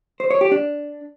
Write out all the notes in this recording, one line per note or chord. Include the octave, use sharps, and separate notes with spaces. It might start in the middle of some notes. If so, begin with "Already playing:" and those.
C5
C#5
G4
D4